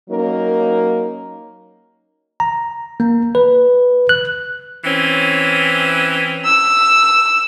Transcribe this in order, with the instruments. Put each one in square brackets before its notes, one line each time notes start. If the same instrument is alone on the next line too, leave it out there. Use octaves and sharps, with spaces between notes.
[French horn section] F#3 A#3 C#4 D#4 A#4
[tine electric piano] A#5
A#3
B4
F#6
[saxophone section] E3 C4 C#4
[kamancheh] E6